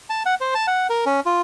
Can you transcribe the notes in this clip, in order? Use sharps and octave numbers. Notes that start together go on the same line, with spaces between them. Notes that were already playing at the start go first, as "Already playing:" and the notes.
A5
F#5
C5
A5
F#5
A#4
C#4
F4